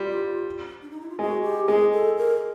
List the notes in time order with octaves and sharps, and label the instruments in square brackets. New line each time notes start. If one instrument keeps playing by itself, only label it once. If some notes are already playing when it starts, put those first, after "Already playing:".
Already playing: [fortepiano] G3 [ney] F4
[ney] D4
D#4
E4
F4
[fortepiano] G#3 [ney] F#4
[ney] G4
[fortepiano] G#3 [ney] G#4
[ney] A4
A#4